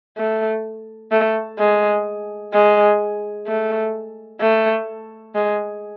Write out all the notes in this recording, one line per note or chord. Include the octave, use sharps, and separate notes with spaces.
A3
A3
G#3
G#3
A3
A3
G#3